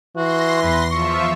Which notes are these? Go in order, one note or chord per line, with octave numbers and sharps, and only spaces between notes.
E3 F#4 C6 A#6
E2 B4
F3 F4 E5 C#6